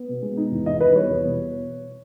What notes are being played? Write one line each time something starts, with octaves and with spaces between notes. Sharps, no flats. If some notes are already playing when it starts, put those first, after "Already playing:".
Already playing: B3
B2
G#3
D#4
E2
E2 D#5
E2 B4
G3 C#5
E2
B2